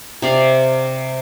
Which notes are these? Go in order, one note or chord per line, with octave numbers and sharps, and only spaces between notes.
C3 D5 F5